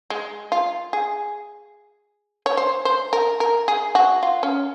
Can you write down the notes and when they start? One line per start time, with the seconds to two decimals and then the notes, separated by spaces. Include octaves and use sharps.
0.10 G#3
0.52 F4
0.93 G#4
2.46 C#5
2.57 C5
2.85 C5
3.13 A#4
3.40 A#4
3.68 G#4
3.95 F#4
4.23 F4
4.43 C#4